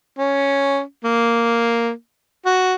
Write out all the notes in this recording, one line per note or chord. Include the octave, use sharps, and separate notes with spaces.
C#4
A#3
F#4